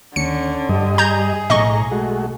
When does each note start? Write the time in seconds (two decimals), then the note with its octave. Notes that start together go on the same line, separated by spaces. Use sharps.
0.16 D#2 D3 C#4 C#7
0.69 G2 G3 D#5
0.98 G#4 A#5 G6 G#6
1.50 B1 A2 D#5 A#5 C#6
1.92 G#3 A3 F#4